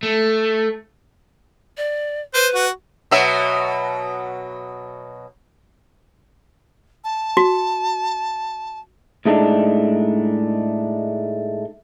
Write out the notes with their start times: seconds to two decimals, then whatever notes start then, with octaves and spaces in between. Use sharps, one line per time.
0.03 A3
1.77 D5
2.34 B4 C5
2.55 F#4
3.11 B2 F#3 E5
7.04 A5
7.37 F#4
9.25 A2 G#3 A3 D4 D#4